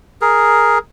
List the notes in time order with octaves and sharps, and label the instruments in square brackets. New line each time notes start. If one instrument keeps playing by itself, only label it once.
[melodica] G#4 A#4